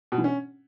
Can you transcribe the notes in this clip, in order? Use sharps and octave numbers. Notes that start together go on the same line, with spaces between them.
B2
E3
C#4